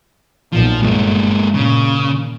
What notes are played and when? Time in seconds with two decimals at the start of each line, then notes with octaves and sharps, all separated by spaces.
0.52 B1 A#2 F3
0.83 G1 G#3 A#3
1.55 A#2 C#3